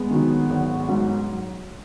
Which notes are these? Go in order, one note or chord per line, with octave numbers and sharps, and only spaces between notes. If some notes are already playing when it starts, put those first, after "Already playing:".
Already playing: G#3 B3
D#3 F#3
G#1
G#2 F#3